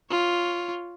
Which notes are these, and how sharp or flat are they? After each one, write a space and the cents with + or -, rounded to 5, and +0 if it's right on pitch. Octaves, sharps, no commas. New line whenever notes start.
F4 +0 C#5 +0